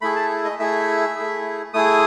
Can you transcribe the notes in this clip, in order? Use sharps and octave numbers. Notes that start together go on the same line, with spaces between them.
A3 E4 G#4 B5
A5
D#5
A3 E4 G#4 E5
A3 E4 G#4
A3 E4 G#4 D#6